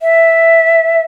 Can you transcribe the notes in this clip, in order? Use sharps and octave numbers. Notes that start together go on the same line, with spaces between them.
E5